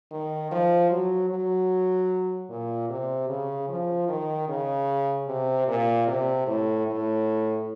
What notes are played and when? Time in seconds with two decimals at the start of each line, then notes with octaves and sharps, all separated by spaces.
0.11 D#3
0.51 F3
0.91 F#3
1.30 F#3
2.50 A#2
2.90 C3
3.29 C#3
3.69 F3
4.09 D#3
4.48 C#3
5.28 C3
5.68 A#2
6.07 C3
6.47 A2
6.87 A2